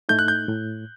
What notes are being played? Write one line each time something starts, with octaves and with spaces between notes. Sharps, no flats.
A2 A3 D#4 G6
F#6
G6
A2